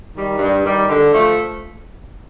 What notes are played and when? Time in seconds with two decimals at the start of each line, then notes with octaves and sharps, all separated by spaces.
0.14 D#3 G3
0.38 G2
0.63 D#3 G3
0.89 D3
1.13 F3 A3